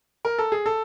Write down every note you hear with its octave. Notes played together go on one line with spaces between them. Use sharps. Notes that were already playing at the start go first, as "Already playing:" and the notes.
A#4
A4
G#4
A4